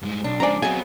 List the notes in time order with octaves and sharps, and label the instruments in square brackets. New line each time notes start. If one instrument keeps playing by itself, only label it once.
[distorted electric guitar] G2 G#3
[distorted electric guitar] B1 [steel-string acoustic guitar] D4
[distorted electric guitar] F3 G#3 [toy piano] C#4 C5 G#5 [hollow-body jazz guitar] D5 A#5
[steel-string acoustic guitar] F#3 G#4 [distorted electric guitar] B3 C4 [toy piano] D#5 F5 [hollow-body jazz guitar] G#5